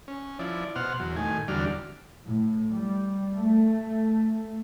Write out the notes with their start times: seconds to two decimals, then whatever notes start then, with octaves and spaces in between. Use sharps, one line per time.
0.08 C#4
0.39 F3 E4 D5
0.76 B2 C5 F#5 F6
1.00 E2 F#3
1.16 A2 D#3 G#5
1.48 E2 D3 F#3 G3 D5 F6
2.26 A2
2.72 G3
3.34 A3